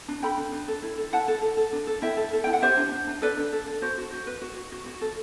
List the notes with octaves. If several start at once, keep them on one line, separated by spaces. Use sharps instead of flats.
D4
A4 G5 B5
D4
D4
A4
E4
A4
E4 F#5 A5
A4
A4
A4
D4
A4
E4 E5 G5
A4
A4
E4 G5
F#5
G4 C5 E5
D4
D4
D4
A4 B4 D5
D4
A4
A4
F#4 C5
F#4
F#4
B4
F#4
F#4
F#4
F#4
A4